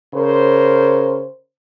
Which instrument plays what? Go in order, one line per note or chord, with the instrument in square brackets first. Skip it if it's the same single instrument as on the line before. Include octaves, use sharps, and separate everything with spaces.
[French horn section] C#3 A#4 C5